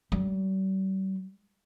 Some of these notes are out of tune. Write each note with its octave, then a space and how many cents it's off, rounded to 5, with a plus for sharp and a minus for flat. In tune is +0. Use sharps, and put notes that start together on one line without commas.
G3 -45